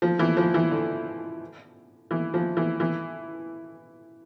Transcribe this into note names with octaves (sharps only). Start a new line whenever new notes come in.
F3
E3
F3
E3
D3
E3
F3
E3
E3